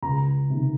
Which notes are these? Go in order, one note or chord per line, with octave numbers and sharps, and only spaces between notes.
C#2 A#5
C3 D#3